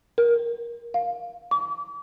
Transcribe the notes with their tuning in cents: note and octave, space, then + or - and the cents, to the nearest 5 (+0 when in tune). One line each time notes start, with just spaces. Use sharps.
A#4 +15
F5 +15
D6 -40